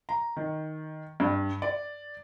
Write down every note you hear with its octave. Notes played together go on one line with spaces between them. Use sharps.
A#5
D#3
G2
D5